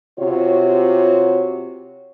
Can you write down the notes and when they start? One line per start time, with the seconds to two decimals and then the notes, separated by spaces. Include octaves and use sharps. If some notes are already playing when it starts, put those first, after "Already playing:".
0.19 C3 F4 F#4 C#5